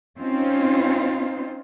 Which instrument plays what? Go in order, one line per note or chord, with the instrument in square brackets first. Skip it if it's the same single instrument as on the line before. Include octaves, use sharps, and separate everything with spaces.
[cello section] C4 C#4 D#4 F4 C5